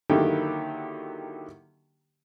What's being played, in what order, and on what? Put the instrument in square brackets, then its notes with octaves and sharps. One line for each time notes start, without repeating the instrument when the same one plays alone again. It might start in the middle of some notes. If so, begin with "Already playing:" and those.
[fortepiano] D3 D#3 F#3 A#3 E4 G4